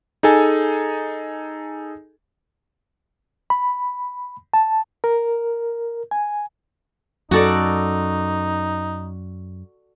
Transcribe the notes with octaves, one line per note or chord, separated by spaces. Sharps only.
D#4 G#4 A4 G#5
B5
A5
A#4
G#5
F#2 D#4 F#4 A4 D5